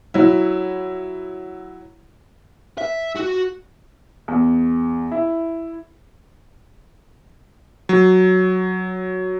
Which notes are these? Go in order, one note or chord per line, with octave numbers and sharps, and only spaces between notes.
F#3 E4
E5
F#4
E2
E4
F#3